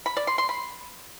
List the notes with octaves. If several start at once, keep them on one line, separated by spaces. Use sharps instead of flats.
B5
D5
C6
C6
B5